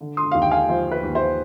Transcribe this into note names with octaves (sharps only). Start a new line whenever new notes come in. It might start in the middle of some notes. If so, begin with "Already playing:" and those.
D3
C6 D#6
D#2 F5
G5
F5 G#5
F3 C5
B4
D#2
C5